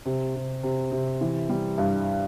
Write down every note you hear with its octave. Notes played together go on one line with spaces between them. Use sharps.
C3
C3
C3
C3
E3
G3
G2